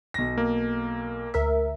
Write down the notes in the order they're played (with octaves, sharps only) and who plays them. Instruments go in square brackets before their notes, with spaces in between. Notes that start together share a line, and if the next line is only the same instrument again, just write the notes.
[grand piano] B1 A#6
[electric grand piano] A#3
[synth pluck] D2 A#4 E5